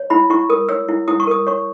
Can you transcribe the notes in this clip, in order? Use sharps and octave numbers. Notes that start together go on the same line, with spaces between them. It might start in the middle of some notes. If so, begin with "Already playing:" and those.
Already playing: C#5
E4 B5
E4 C#6
A#4 D#6
C#5 E6
E4
E4 D#6
C#6
A#4 D#6
C#5 C#6